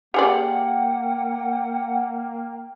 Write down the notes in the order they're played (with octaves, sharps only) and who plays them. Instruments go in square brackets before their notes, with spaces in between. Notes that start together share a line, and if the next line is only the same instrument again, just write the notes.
[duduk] A#3 [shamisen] G4 G#4 D5 [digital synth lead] F#5 [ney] G5